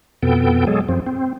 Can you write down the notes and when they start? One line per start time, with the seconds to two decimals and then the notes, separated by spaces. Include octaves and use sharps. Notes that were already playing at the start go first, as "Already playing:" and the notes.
0.23 F2 B2 B3 A4 G5
0.67 F#3 G#3 G#4 A4
0.89 F#2 F3 C4
1.07 C4